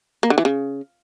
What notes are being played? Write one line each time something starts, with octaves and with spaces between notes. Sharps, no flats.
A#3
D3
E3
C#3